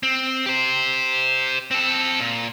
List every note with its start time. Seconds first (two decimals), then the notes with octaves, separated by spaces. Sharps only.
0.03 C4
0.46 G4 C5
1.71 C4 A4
2.20 A#2